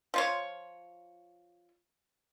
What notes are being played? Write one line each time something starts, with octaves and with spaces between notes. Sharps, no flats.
F3 F4 C#5